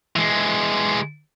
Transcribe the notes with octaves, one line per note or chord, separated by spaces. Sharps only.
E3 G#3